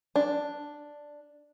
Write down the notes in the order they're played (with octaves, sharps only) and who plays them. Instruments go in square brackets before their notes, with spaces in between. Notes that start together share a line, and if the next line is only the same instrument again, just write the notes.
[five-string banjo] D4